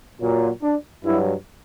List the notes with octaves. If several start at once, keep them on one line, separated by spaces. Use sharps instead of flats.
A#2 F#3
D4
G2 F#3 E4